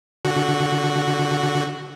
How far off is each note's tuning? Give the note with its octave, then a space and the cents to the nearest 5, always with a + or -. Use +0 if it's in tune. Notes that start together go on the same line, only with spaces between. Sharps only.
D3 -25 F#4 -5